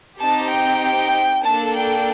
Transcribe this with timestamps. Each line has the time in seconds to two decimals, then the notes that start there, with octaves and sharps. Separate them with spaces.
0.20 C4 D#4 G4 A5
0.51 G5
1.44 A#3 D4 A4 A5
1.76 G5